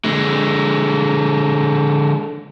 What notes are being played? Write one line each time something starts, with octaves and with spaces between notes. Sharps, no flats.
D3 G#3